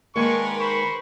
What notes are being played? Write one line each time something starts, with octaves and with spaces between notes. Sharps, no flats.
D#3 G#3 A#3 D4 A#4 B4 G#5 C#6
C5 B5 C#6